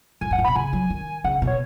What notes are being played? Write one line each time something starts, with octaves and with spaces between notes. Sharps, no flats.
G#2 G#5
F#2 F#5
G#2
B2 B5
C#3 G#5
F#3
D#3
C#3 F#5
B2
C#5